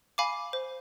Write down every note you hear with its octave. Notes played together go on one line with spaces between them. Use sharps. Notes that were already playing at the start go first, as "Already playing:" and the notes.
F5 G#5 B5 D6
C5